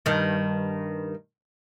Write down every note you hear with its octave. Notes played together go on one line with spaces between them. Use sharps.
G2 D#3